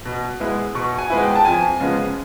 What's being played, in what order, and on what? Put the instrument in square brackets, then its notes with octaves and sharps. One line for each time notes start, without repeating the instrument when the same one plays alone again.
[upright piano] B2
G#3 B3 E4
B2 C#6
G#5
G#3 B3 E4
G5
A5
F2 G#5
C#3 F3 G#3 B3